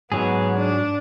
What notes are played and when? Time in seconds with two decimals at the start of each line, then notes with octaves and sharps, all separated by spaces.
0.12 G#2 F#3 B3 G#4
0.56 D4